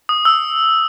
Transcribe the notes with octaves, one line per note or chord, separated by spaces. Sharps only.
D#6
E6